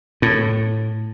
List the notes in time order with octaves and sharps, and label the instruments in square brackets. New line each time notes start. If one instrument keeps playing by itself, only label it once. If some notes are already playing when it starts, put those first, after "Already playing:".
[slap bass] A2